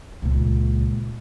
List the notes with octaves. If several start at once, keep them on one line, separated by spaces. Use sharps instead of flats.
C#2 A#2